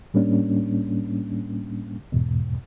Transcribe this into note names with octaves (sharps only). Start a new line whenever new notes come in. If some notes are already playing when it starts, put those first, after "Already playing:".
A2 G3 A#3 C#4 D4
E2 G#2 B2